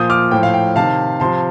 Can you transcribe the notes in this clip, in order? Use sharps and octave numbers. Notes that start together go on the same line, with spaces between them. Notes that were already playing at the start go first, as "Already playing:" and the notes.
Already playing: A#2 F3 D#6 G6
D6 F6
A2 F3 G5
F5
G5
C3 D#3 F5 A5
C3 F3 A5 C6